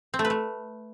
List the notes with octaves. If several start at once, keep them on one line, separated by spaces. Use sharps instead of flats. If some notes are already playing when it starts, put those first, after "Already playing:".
C4
A3
B4
A3